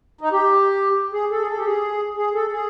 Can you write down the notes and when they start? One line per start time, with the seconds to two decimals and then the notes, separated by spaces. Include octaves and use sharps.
0.21 D#4
0.32 G4
1.13 G#4
1.31 A4
1.39 G#4
1.48 A4
1.58 G4
1.65 G#4
2.17 G#4
2.34 A4
2.52 G#4